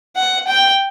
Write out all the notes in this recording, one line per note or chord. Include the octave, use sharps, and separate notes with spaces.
F#5
G5